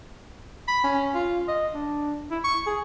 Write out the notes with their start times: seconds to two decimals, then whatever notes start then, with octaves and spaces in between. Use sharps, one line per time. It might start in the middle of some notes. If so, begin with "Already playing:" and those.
0.68 B5
0.84 C#4
1.15 F4
1.48 D#5
1.74 D4
2.31 E4
2.44 C#6
2.66 G#4